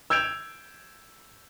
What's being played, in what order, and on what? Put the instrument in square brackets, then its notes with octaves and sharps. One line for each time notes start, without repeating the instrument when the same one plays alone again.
[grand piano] E6 G6 G#6 D7 F7